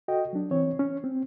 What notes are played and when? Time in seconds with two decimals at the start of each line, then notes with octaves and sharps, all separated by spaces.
0.08 F#4 A4 D#5 G5
0.33 F#3 D4
0.51 E3 C4 C#5
0.79 C#4
1.04 C4